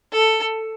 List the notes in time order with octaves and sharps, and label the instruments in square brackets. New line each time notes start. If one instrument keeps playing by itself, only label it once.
[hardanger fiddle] A4